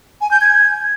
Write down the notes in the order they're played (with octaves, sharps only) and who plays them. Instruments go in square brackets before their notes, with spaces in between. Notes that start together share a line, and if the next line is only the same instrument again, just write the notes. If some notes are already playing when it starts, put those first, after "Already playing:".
[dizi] G#5
G6
G#6